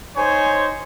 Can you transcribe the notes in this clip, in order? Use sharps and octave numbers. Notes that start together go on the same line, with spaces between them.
D#4 C5 C#5 G#5